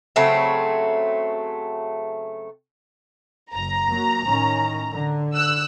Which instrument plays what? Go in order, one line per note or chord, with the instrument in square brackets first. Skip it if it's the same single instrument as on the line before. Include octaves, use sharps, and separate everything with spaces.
[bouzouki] C#3 F#3 A3 C4
[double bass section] F#1 [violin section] A#5
[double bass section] F#3 A#3
A2 D#3 C#4
D3
[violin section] E6 F#6